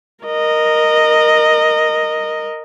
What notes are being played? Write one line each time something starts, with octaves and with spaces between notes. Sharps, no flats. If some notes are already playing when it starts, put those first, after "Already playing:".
A#4 D#5